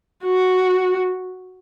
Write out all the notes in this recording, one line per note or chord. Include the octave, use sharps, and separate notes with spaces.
F#4